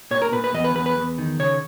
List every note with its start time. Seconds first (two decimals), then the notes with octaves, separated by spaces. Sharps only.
0.11 A#2 C#5
0.22 A#4
0.32 A#2 B4
0.44 B4
0.54 E2 D#5
0.64 B4
0.75 E2 B4
0.86 B4
0.97 E2
1.18 D#3
1.39 C#3 C#5